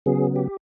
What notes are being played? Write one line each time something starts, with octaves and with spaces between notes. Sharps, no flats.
C#3 F#3 B3 G#4
G4